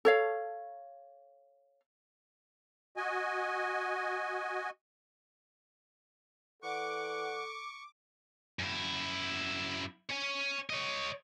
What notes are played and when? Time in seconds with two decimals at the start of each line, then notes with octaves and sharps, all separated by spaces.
0.05 A4 C#5 F5
2.97 F#4 D#5 G#5
6.62 E3 A4 D5 F#5 C#6 D6
8.59 F#2 E4
10.09 C#5 G#5
10.70 C#5 D#5